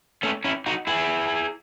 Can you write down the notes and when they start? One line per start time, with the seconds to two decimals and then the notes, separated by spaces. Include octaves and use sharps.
0.23 A3 C#4
0.44 C#4 E4
0.66 D#4 F#4
0.87 E4 G#4